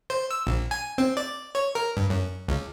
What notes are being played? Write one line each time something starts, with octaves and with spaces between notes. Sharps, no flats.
C5
E6
A#1
G#5
C4
D5
C#5
A#4
G2
F#2
C#2